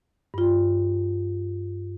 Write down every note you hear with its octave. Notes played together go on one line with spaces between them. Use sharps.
G2 F4